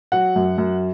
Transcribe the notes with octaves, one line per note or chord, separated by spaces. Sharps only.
F#3 F#5
F#2
F#2